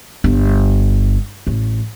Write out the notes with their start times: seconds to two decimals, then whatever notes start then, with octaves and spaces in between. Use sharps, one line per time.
0.24 G1
1.47 A1